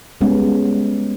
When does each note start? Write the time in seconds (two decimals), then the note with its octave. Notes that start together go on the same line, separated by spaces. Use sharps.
0.21 G3 G#3 B3 C#4